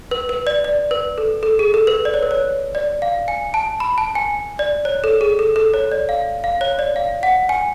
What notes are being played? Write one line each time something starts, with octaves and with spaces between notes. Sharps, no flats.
B4
B4
D5
D5
B4
A4
A4
G#4
A4
B4
D5
C#5
B4
C#5
D5
F5
G#5
A5
B5
A5
G#5
D5
C#5
A4
G#4
A4
A4
C#5
D5
F5
F5
C#5
D5
F5
F#5
G#5